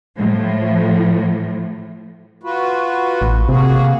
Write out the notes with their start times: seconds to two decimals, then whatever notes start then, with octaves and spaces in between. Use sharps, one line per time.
0.15 A2 F3
2.43 F4 F#4 B4
3.21 A1
3.49 C3 A#3 F#4 G#4